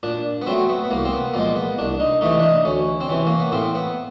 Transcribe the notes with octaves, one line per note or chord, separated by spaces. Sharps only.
A#2 D4
B3
F#3 A3 C4
B3
B3
C2 A#3
C4
B3
A#2 F3 G#3 A#3
B3
C2 D4
D#4
C3 E3 A3 D#4
D4
D#4
D2 C#4
C4
C3 E3 C#4
A#3
B3
A2 C4
B3